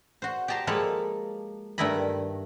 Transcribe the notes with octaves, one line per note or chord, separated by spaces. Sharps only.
F#4 C5
G4 D#5 A5 A#5 C6
F3 G#3 A#3 A4 A5 B5
G2 D#3 A3 E4 D#5 B5